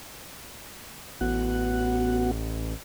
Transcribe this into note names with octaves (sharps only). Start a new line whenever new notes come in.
A1 B3 F#4 F#5